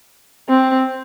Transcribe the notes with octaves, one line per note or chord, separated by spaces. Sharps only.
C4